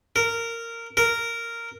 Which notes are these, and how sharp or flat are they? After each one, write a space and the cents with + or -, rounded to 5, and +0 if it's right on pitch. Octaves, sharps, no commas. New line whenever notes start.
A#4 -15
A#4 -10